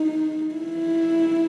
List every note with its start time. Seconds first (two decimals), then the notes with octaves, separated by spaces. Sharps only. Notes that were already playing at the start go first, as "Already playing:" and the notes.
Already playing: D#4
0.54 E4